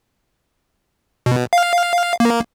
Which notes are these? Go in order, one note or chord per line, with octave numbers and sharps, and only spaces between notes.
B2
F5
A#3